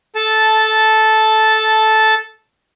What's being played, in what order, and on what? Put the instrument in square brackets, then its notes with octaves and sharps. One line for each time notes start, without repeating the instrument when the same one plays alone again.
[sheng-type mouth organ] A4 A5